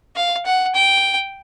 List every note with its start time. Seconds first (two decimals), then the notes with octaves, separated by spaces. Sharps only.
0.16 F5
0.45 F#5
0.74 G5